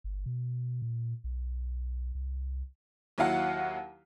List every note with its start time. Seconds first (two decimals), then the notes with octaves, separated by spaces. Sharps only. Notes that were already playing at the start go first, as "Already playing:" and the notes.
0.04 G1
0.26 B2
0.82 A#2
1.24 B1
2.15 C2
3.18 D#2 F#3 E4 F5 F#5